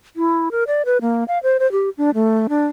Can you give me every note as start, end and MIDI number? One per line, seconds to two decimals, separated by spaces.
0.16 0.49 64
0.52 0.64 70
0.67 0.82 74
0.86 0.98 71
1.01 1.24 58
1.28 1.39 77
1.43 1.57 72
1.60 1.70 72
1.72 1.90 67
1.98 2.10 62
2.14 2.47 57
2.49 2.66 62